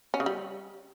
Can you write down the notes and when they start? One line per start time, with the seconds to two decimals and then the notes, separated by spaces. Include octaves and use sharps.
0.14 C#4
0.20 C#3
0.26 G3